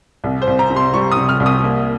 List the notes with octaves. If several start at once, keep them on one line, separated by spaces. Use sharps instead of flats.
C2
C5
C2
A#5
C3
C6
G3 C#6
D#6
C3
F6
C2
D#6
A#3